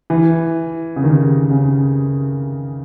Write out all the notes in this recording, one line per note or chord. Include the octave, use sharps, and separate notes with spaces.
E3
C#3
D#3
C#3